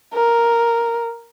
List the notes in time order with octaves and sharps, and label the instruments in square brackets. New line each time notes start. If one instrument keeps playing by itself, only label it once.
[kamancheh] A#4